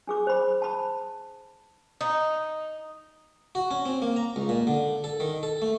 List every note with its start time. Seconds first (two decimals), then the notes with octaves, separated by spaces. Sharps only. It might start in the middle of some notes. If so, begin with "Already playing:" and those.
0.07 D4 G#4 D6
0.27 C5 B5
0.62 A5 B5
2.01 D#4
3.55 F#4
3.71 C#4
3.85 C4
4.02 A#3
4.16 A#5
4.36 C#2
4.49 A#2
4.67 D3
5.04 A4
5.20 D#3
5.43 A4
5.62 A3